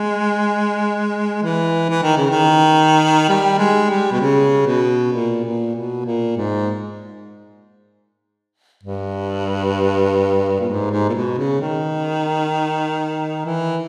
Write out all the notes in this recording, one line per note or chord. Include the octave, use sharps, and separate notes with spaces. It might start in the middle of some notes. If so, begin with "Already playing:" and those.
Already playing: G#3
E3
E3
D#3
C#3
D#3
G3
G#3
G3
B2
C#3
B2
A#2
A#2
B2
A#2
G#2
G2
A#2
G#2
G#2
A#2
B2
C#3
D#3
E3